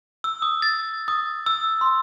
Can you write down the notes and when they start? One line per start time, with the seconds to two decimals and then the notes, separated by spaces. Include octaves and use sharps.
0.24 E6
0.42 D#6
0.62 A6
1.08 D#6
1.46 E6
1.81 C6